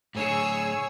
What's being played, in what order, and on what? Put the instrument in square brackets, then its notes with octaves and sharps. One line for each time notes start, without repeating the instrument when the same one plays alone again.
[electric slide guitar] A2 D3 [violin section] G#4 C#5 E6